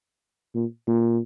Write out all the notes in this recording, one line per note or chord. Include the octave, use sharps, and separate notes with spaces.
A#2
A#2